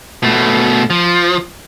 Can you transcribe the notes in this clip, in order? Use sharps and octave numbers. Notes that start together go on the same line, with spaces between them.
B2 A3
F3